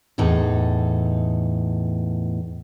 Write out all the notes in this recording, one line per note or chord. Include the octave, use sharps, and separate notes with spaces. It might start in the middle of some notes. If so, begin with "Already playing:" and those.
E2 A2 D#4 A4